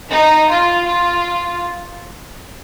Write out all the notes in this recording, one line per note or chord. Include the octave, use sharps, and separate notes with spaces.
D#4
F4
F4